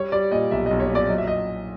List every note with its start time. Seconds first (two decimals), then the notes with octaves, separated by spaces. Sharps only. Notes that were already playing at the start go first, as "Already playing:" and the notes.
Already playing: G3 C#5
0.12 G3 D5
0.31 A#2 D#5
0.51 B1 E5
0.66 B1 D#5
0.80 C#5
0.89 A#2
0.95 D5
1.09 F#3 D#5
1.18 E5
1.27 D#5